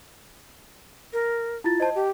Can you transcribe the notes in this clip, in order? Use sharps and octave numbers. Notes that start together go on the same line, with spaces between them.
A#4
E4 F4 A6
C5 D#5 A5
G4